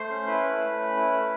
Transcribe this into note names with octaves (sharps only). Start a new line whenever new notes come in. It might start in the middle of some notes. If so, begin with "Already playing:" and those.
Already playing: A3 C5 C6
C#4
E4 B4 B5
A3
A3
C#4
E4
A3